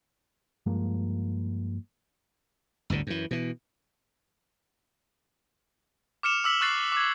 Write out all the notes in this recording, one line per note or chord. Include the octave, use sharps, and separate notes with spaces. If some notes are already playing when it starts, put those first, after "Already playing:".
G2 F3 G#3 A#3
G1 D2 A2 D3
F#2 E3
B2 E3
D6 F6 C#7 E7 F7
D6 E6 B6 F#7
C#6 F#6 A6 C7 E7
D6 G#6